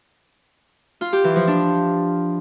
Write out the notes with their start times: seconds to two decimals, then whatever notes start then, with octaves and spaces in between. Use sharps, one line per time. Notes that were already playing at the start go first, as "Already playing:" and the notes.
1.01 F4
1.13 G4
1.24 E3
1.36 F3
1.47 D4